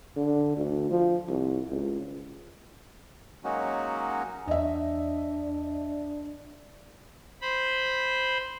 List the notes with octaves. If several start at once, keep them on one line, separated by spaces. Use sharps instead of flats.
D3
D2
F3
C2
C#2
F#3 G#3 A#3 C#4 D#4 F#4
E2 D4 D#5 E5
C5 B5